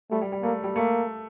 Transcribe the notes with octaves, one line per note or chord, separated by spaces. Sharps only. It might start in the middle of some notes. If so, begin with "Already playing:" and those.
G3 A3
G3
G3
A3 A#3
G3
A3 A#3